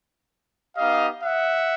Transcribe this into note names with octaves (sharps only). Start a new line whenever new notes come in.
B3 D#4 G4 D#5 F5
E5 F#5